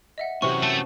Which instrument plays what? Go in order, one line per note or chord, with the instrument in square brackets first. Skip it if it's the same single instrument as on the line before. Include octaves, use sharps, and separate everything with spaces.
[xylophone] D#5 E5 F#5
[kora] C3 E3 G4 [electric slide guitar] C#4 F#4 [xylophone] C#6
[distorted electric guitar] A3 [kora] C5 [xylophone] A5